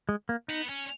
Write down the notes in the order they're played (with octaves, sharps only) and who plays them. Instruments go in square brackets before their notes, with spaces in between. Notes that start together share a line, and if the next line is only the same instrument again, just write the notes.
[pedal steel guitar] G#3
A#3
[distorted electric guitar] B3 [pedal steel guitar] D#4
[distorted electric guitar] C#4